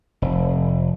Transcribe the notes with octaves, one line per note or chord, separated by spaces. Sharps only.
F1